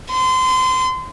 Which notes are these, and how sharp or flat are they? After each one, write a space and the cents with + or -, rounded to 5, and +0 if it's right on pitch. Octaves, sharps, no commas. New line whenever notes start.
C6 -30